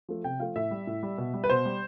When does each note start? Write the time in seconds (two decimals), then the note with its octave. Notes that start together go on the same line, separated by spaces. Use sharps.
0.09 F3 A3
0.24 C3 G5
0.40 F3 A3 F5
0.56 A2 E5
0.71 G3
0.87 A2
1.03 G3
1.18 B2
1.34 G3
1.44 B4
1.50 B2 C5
1.65 G3